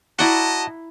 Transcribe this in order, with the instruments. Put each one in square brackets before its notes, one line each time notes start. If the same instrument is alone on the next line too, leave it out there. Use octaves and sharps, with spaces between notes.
[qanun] E4 A#5 C6 [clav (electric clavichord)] F#4 D5 [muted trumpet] D#5 [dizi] A5